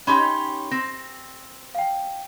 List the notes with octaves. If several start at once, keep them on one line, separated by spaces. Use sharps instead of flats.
C#4 D#4 G4 B5 C6
C4 A#6
F5 G5